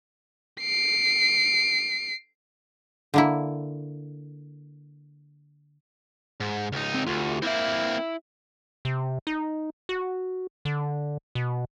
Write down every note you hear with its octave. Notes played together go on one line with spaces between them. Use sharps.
C7 D7
D3 A#3 E4
G#2
C#2 D#4
C4
D2 F4 G4
A#3 C4 E4 E5
C3
D#4
F#4
D3
B2